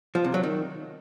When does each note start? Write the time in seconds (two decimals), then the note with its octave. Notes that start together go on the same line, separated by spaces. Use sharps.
0.15 F3
0.24 C3
0.34 F#3
0.43 D#3